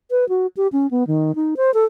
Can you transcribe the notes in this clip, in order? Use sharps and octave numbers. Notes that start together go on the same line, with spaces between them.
B4
F#4
G4
C#4
B3
D#3
D#4
C5
A4